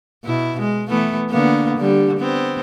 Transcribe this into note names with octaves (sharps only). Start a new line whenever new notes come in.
B2 E4
G#3
E3 A3 B3
D3 A#3 B3
D3 G3
B3 C4